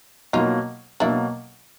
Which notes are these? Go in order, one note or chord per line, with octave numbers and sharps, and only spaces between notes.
B2 F#3 A#3 D#4 F4
B2 F#3 A#3 D4 E4